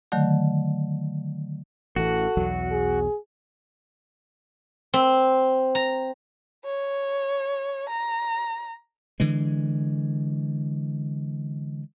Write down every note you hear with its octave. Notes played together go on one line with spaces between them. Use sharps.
D3 D#3 F#3 A3
A1 E3 F#4 A4
B1 E2 F#3
G#4
C4
A#5
C#5
A#5
D3 E3 G#3